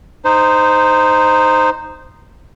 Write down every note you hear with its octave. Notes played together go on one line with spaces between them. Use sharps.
D#4 C5